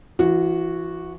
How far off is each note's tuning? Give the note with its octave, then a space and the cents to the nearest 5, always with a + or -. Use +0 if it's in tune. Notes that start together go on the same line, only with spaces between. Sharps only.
E3 +30 F#4 -5